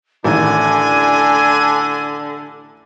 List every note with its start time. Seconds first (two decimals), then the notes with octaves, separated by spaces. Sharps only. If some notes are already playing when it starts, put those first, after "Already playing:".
0.24 A1 D3 D#3 D4 G#5